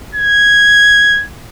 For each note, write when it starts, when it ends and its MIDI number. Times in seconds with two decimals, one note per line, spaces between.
0.15 1.25 92